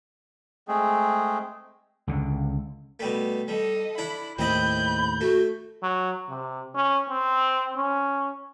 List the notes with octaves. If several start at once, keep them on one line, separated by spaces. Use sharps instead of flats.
G#3 A3 C4 G#4
C#2 D3
B2 G3 A3
G3 A4 D#5
D4 E4 B5
D#2 A2 C4 E4 D#5 B5 G6
A3 F#4
F#3
C3
C#4
C4
C#4